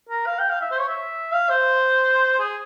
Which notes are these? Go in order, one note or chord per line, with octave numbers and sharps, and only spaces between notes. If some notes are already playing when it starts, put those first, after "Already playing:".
A#4
F5
G5
F5
E5
C5
C#5
E5
F5
C5
G#4